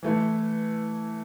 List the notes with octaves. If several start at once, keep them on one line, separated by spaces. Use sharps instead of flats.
E3 A3 E4